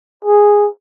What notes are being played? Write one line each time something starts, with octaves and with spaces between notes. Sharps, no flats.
G#4